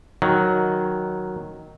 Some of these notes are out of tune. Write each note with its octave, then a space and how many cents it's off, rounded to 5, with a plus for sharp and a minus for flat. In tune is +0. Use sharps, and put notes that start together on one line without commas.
D#3 +0 F#3 +0